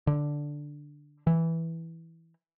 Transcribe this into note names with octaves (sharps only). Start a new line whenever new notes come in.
D3
E3